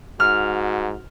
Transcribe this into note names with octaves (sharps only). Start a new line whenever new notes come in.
G#2 F#4 F6